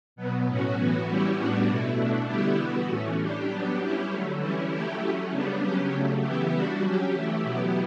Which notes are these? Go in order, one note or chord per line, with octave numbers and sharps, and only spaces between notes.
B2 F#3 B3
A2 F#3 C#4 F#4
A2 E3 B3 F#4
G3 C#4 E4 G4
A2 G3 B3 D4 F#4
B2 A3 E4
B2 A3 D4
D3 G3 B3 E4 G4
E3 B3 F#4
A2 E3 A3 C#4
G3 D4 G4
F#3 B3 D4 G4
G3 C#4 E4 G4
D3 F#3 A3
E3 G3 C#4 E4
F#3 A3 E4 G4
F#3 A3 C#4
C#3 G3 B3 D4
C#3 F#3 C#4 G4
C#3 F#3 A3
C#3 E3 B3 E4 G4
G3 D4 F#4
F#3 C#4 G4
E3 A3 E4 G4
B2 F#3 B3 E4 G4